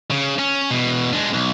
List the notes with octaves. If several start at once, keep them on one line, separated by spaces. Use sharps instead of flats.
C#3
C#4
E2 B2
G#3 D4
B1